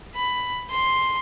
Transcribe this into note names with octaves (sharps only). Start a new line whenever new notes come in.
B5
C6